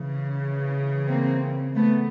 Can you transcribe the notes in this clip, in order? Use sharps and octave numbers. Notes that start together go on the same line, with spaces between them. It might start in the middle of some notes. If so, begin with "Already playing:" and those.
Already playing: C#3 E3
A#3 C4
A3 B3